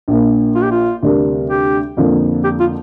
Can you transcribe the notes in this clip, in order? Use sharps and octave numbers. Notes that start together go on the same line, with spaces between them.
A#1 A#2 A#3
F4
G4
F4
D2 C3 G3 D4 A#4
G4
F2 D3 F3 A#3
G4
F4